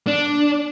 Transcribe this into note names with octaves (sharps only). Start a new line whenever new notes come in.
D4